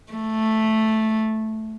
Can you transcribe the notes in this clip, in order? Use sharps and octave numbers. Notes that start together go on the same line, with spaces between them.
A3